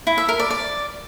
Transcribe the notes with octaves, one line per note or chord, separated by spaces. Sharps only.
E4
E5
A#4
D5
D5